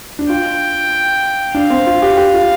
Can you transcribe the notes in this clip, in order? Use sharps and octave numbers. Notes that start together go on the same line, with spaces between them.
D4
F4 G5
D4 F5
C4
F4
G4
G4
F4